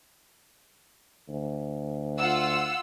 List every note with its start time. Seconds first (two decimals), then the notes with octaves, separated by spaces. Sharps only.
1.28 D2
2.18 F4 F#5 E6